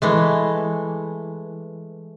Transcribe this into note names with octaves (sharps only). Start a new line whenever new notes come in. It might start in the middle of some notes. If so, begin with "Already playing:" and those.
E3 G#3 A3